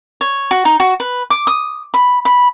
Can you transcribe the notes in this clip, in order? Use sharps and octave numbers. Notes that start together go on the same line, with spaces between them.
C#5
F#4
D#4
F#4
B4
D6
D#6
B5
B5